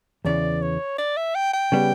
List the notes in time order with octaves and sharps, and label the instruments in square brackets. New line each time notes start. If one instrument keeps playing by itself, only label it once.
[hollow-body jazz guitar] E2 C#3 E3 [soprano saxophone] D5
[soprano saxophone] C#5
D5
E5
G5
G5
[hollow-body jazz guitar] C#3 G3 B3